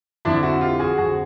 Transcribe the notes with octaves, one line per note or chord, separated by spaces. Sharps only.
F2 D3 F3 D4 E4
E4 F#4
F4 G4
F#4 G#4
F2 D3 F3 F#4 G#4